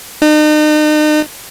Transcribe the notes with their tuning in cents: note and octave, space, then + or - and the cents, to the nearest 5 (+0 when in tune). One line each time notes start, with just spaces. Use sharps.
D#4 -40